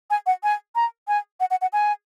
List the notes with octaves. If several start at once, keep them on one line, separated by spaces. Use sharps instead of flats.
G#5
F#5
G#5
A#5
G#5
F#5
F#5
F#5
G#5